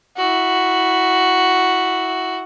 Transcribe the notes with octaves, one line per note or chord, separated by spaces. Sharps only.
E4 F#4